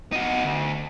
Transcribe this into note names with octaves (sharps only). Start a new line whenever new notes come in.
D#4 F#4
D2